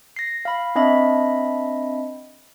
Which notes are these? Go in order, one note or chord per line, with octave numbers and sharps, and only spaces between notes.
A#6 C7
F5 B5
C4 D4 D#5 E5 B5